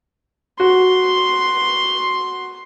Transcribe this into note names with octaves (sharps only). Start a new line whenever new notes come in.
F#4 C6